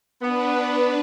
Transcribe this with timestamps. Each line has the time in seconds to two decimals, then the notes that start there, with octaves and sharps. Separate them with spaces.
0.22 B3 D4 B4